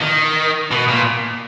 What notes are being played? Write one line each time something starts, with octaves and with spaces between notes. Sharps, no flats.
D#3
B2
A#2